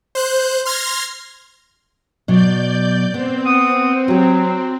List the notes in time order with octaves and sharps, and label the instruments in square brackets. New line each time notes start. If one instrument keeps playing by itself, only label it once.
[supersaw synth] C5 F#6 G6
C6 F6 G#6 A#6
[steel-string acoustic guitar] B2 F#3 [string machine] D5 G6
[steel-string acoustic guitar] B3 [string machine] C4
[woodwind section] F#5 D#6
[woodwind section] F#3 [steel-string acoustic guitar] F#4 G4